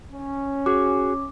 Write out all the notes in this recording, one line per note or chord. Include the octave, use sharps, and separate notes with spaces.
C#4
F#4 G#4 D6